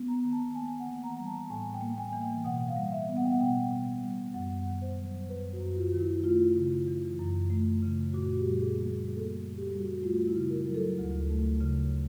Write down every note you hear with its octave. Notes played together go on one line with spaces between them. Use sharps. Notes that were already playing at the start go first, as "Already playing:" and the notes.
Already playing: B3
A#5
D#3
A5
A#3 G#5
F#5
E3
A#5
G3
A5
A2 G#5
G5
A#3
G#5
E3
G5
B2 F#5
F5
G3
E5
B3
F#5
G5
F#5
B2 G5
B2
G3
F#2 F#5
D#3
C5
F#3
F#2 B4
F#4
F#2
F4
D#3
E4
A3 F4
C#3
E3
F#2
A3
C#3
A#2 F#4
G4
G3
G#4
A#3
G#4
A#2 G#4
A4
G#4
A#2
G4
G3
F#4
A3 F4
E4
C#3
A#4
F#3
A4
D2
A3
C#3